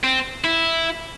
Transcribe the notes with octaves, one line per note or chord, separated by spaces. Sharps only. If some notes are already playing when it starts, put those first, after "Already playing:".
C4
E4